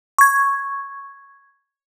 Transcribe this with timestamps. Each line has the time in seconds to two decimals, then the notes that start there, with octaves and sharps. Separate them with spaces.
0.18 C#6 G#6